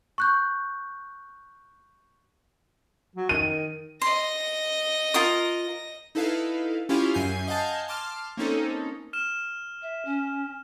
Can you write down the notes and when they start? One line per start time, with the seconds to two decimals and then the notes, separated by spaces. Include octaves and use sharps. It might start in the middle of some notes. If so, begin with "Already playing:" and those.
0.18 C#6 F#6 G6
3.16 F#3
3.29 D#3 D#7
4.01 D#5 C6 A#6
5.14 F4 A#4 D#6
6.15 D#4 E4 A4 B4 F5
6.89 C#4 E4 F4 G4 F5
7.14 F#2 G#5 G6 C7
7.47 D#5 F5 F#5 G#5 A5 G6
7.88 A5 C6 D6 F6
8.37 A#3 C4 C#4 D#4 A4
9.13 F6 E7
9.82 E5
10.05 C#4